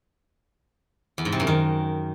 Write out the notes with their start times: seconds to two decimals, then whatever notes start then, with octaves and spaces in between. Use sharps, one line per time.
1.18 E2
1.25 G#2
1.32 C3
1.40 F#2
1.47 D#3